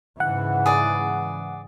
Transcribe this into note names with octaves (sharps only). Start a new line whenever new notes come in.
G#2 C#3 E3 F#5
G#4 D5